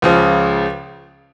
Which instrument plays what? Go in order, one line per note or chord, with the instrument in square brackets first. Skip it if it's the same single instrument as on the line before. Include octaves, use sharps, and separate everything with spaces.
[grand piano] C#2 C#3 F3